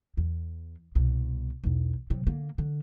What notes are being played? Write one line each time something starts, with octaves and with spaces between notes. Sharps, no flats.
E2
C2 B2
B1 E2
C3 F#3
D3 A#3
D3